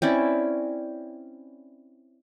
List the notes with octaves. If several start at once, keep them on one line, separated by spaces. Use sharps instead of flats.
C4 C#4 E4 D5